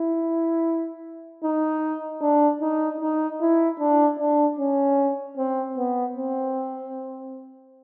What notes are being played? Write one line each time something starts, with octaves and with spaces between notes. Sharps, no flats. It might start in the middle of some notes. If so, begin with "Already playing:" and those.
Already playing: E4
D#4
D4
D#4
D#4
E4
D4
D4
C#4
C4
B3
C4